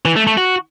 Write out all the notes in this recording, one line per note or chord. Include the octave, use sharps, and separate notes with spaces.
E3
A3
A3
F#4